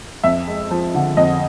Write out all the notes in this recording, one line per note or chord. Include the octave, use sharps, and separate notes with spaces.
F2 E5
G#3
F3
D3
F2 D#5